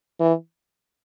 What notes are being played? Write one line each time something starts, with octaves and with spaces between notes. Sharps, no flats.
E3